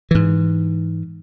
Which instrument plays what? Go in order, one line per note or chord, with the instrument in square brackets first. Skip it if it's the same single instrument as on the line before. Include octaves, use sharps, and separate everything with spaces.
[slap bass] G#2 E3